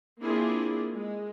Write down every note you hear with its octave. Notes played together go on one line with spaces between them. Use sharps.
A#3 C4 D4 E4 F4 G#4
G#3